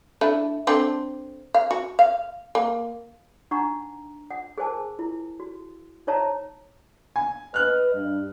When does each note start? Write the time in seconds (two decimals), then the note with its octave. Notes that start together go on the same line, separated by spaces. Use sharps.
0.21 A3 D4 E4
0.67 C4 D4 A4
1.54 F5
1.71 F#4
1.99 F5
2.55 A#3
3.51 D4 D#4 F#5 A#5 C#6
4.31 F#5
4.58 G#4 A#4 C5 G#5 A5
4.99 E4
5.40 F#4
6.07 D#4 C5 C#5 E5 A5 A#5
7.16 G#5
7.54 B4 D#5 F6 F#6
7.94 G2